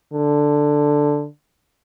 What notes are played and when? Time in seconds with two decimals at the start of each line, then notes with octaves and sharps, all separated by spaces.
0.13 D3